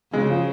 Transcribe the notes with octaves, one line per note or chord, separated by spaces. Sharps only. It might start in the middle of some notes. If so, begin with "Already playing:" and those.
C#3 G#3
F3